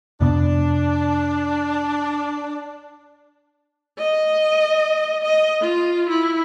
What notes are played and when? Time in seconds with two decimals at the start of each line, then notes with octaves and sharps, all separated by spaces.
0.21 F2 C3 B3 D4
3.99 D#5
5.23 D#5
5.61 F4
6.09 E4